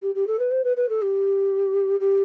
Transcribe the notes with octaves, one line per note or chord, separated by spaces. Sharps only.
G4
G4
A4
B4
C5
B4
B4
A4
G4
G4